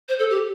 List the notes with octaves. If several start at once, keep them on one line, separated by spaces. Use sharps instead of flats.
C5
A4
G4